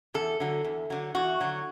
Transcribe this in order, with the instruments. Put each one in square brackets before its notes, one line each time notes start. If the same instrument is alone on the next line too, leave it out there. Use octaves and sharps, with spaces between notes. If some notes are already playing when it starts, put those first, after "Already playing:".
[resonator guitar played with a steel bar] E2 A4
D3 F#3
E2
D3 F#3
E2 F#4
D3 F#3